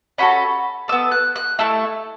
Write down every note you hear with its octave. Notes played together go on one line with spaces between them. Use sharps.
C#4 F#4 A4 B5
B3 A4 E6
F#6
F#6
A3 E4 A4 E6